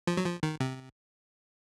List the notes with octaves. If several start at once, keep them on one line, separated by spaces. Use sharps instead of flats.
F3
F#3
F3
D#3
C3